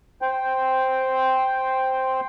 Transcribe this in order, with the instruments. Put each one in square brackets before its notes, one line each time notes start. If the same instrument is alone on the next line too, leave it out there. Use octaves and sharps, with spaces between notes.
[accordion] C5 G5